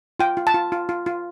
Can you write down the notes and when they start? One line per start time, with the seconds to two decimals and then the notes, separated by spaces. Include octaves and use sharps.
0.20 F4 G5
0.37 F4
0.47 A5
0.54 F4
0.72 F4
0.89 F4
1.06 F4